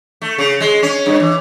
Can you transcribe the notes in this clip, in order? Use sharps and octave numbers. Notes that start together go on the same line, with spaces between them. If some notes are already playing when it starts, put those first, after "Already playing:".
A3
C#3
G#3
C#4
G2
E3